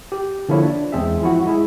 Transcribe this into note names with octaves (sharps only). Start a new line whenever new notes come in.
G4
D3 F3 A#3 E4 C#5
D4
E2 G#3 C4 G#4 E5
F3 E4 F#4
G#3 E4 G#4